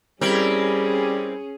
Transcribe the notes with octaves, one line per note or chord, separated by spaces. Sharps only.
G3 C4 C#4 E4 G#4 A#4